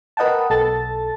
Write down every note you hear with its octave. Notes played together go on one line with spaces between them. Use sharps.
A#4 B4 D#5 F#5 G5 A5
B1 A4 A5 A6